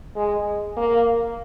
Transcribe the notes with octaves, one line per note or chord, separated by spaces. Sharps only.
G#3
A#3